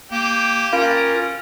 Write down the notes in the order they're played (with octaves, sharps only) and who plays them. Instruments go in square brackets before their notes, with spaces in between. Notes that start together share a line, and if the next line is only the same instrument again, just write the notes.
[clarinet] A#3 [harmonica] G4
[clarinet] C#4 [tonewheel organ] F4 A#4 [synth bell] F5